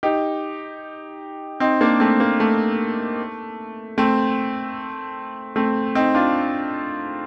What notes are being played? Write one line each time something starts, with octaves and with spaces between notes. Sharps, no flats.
D#4 G4
C4 D#4
A#3 D4
A3 C4
A#3
A3
A3 C4
A3 C4
C4 D#4
D4 F4